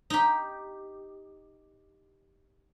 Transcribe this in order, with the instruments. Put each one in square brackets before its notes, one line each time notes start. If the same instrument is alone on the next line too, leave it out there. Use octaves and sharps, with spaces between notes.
[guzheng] D#4 G4